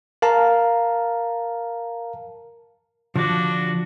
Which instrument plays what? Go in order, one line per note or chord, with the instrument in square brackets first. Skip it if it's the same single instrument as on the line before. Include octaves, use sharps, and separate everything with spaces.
[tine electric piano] A#4 F5 A5 A#5
[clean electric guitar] D3 D5 [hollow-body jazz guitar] F3 [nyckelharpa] D4 F#4